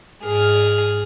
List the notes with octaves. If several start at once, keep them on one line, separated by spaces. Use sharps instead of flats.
G#2 G#4 F6